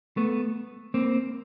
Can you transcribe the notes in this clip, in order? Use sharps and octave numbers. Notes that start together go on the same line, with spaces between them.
A3 B3
A#3 C4